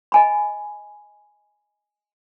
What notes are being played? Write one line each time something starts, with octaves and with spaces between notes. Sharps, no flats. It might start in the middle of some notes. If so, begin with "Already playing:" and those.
D#5 G#5 B5